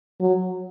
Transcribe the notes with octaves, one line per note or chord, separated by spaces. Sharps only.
F#3